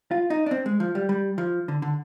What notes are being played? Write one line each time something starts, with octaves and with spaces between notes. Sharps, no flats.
F4
D#4
D4
C4
G#3
F3
G3
G3
F3
D3
D3